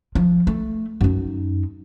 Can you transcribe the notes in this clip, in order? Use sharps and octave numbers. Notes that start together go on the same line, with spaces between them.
F3
A3
F#2 D#4